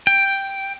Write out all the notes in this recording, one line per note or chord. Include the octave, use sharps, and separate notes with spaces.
G5